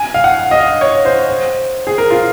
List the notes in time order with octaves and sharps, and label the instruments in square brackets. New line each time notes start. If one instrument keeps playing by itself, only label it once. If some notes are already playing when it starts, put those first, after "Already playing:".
Already playing: [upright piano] G#5
F5
F#5
D#5
F5
C#5
C5
G#4
A#4
F4